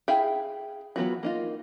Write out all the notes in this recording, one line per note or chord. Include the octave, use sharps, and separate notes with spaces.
E4 G#4 E5 F5 G5
E3 F#3 B3 F4 F#4
A#3 D#4 F4